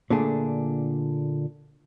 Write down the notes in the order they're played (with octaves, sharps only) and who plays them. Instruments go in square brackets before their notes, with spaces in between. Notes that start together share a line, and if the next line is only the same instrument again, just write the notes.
[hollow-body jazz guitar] A#2 D3 A3 D4 G#4